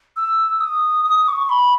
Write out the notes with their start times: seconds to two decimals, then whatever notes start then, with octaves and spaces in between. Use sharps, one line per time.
0.16 E6
0.60 D#6
1.05 D#6
1.28 C#6
1.49 B5